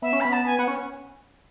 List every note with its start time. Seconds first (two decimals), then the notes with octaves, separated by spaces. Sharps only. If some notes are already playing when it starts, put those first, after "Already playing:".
0.02 B3 E5
0.13 C#4
0.20 B3 B5
0.32 A5
0.45 G#5
0.58 B3 F#5
0.68 C#4